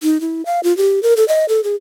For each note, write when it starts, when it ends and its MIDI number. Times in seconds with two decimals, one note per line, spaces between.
0.03 0.20 63
0.21 0.45 64
0.46 0.60 77
0.64 0.75 65
0.77 1.02 67
1.03 1.14 70
1.17 1.27 69
1.28 1.45 75
1.49 1.63 69
1.64 1.75 68